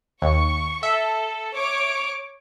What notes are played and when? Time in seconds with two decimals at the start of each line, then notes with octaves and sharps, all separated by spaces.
0.22 D#2 C#6
0.83 A4 E5
1.54 C#5 D6